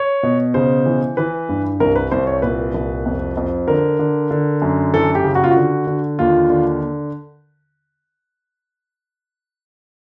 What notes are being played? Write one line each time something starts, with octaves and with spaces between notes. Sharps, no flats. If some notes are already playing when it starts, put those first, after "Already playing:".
Already playing: C#5
B2
C#3 C5
E3
E3 B4
G2
C2 A#4
B4
C2 C5
C#5
A#2 B4
C2
F2
F2
D3 A#4
D3
D3
F#2
E3 A4
G4
C#3
F#4
F4
F#4
D3
D3
D#2 F4
D3